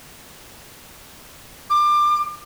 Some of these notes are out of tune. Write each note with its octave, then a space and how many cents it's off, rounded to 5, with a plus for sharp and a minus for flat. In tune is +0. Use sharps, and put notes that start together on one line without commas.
D6 +25